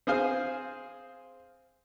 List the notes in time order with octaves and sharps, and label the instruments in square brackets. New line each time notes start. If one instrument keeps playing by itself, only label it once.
[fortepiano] C4 G#4 C5 F5 G#5